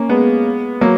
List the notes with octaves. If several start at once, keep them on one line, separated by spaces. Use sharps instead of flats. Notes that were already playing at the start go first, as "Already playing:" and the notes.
Already playing: A#3 C#4
G#3 B3
F#3 A#3